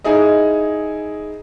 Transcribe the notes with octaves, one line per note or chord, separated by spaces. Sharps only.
D#4 E4 G#4 D#5